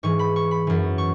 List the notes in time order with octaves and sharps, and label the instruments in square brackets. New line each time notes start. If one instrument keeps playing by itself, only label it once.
[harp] G#2 E3 C#6
B5
C#6
B5
F#2 E3
C#6